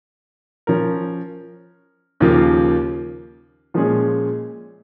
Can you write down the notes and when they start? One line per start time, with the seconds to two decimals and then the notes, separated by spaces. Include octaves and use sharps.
0.67 F3 C#4 A#4
2.20 D#2 C#3 F3 A#3 F4
3.74 A#2 F3 G#3 C#4 G#4